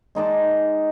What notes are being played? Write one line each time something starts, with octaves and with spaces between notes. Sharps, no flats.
G#3 D#4 D5 A5